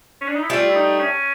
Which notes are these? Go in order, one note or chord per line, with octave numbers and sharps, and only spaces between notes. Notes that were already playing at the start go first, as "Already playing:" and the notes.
C#4
D4
D#4
E4
G3 A3 F4
E4
D#4
C#4